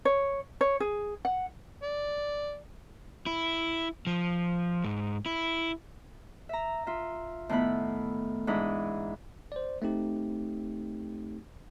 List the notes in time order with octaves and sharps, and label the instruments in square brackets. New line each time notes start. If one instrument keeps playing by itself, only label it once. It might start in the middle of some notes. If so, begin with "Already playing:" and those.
[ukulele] C#5
C#5
G#4
F#5
[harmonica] D5
[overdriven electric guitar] E4
F3
G#2
E4
[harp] E5 A#5
F4 E5
A2 D#3 A3 B3 E4 B5
G#2 E3 D4 E4 B5 D#6
[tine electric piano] C5 D5
A3 C4 D#4 G4